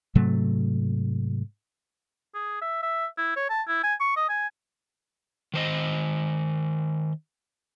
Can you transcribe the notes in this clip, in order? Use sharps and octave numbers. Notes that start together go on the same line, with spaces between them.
G#2 C3 F#3 A3
G#4
E5
E5
E4
C#5
A5
E4
G#5
C#6
D#5
G#5
D#3 C5 D#5